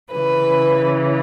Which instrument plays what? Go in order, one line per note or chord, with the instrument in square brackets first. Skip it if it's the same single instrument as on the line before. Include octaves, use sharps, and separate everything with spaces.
[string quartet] C#3 E3 B4